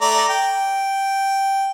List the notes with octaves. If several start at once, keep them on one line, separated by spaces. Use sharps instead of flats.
A3 D5 A#5
G5